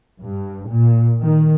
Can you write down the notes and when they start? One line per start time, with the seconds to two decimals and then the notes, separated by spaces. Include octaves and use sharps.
0.22 G2
0.69 A#2
1.22 D#3